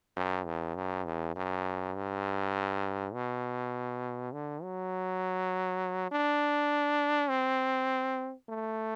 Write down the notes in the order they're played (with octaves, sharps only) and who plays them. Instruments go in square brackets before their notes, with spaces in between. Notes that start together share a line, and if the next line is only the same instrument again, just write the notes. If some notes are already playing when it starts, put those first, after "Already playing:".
[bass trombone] F#2
E2
F#2
E2
F#2
G2
B2
D3
F#3
D4
C4
A3